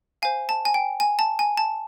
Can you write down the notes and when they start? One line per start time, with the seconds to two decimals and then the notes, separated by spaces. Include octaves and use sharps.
0.22 C5 F5 G#5
0.49 A5
0.65 G#5
0.74 G5
1.00 G#5
1.19 A5
1.39 G#5
1.57 A5